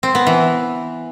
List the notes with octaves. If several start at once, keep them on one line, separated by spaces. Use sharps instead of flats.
C4
B3
E3